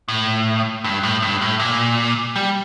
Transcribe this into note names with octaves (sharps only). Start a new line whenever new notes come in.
A2
G2
A2
G2
A2
A#2
G3